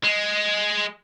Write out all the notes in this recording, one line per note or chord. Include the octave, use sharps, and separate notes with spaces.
G#3